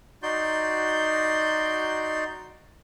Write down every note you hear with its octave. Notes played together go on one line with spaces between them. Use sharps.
D#4 F#4 D5 C6 G6